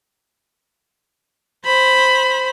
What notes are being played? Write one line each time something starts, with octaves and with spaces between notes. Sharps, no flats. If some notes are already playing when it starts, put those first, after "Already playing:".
C5 B5